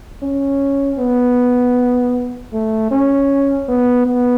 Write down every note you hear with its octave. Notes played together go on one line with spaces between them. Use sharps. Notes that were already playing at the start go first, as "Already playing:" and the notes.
C#4
B3
A3
C#4
B3
B3